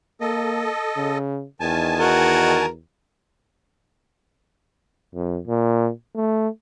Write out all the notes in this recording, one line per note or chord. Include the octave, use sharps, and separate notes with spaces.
A#3 A4 D#5
C#3
E2 D#3 G#5 A5
F#4 A#4
F2
A#2
A3